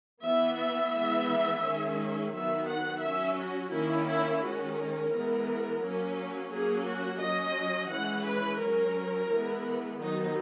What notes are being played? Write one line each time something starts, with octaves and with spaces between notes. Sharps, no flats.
E3 B3 E5
E5
E3 G#3 B3
D#3 G#3 C#4
D#3 F#3 B3 E5
F#5
F#3 C#4 E5
F#4
D#3 A#3 C#4 E4
E4
D#3 G#3 C#4 F#4
A#4
E3 G#3 B3
F#3 A#3 C#4
F#3 A#3 C#4 G#4
F#4
F#3 C#4 D#5
E3 G#3 C#4 F#5
B4
F#3 C#4 A#4
E3 G#3 B3
D#3 F#3 B3 D#4